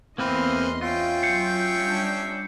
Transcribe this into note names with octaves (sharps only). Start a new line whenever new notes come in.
E2 E3 A#3 C4 B4 D#5 C6 F6
C#4 F4 E5 G5
F#3 G6 C7 C#7
G3 D4